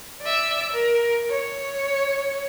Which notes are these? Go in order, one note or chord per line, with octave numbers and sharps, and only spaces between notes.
D5 E5
A#4
C#5